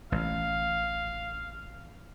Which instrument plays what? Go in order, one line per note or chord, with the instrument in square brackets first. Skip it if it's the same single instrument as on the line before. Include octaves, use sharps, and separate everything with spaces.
[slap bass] A1 [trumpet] F5